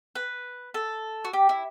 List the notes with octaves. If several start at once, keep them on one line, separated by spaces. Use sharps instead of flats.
B4
A4
F#4
G4
E4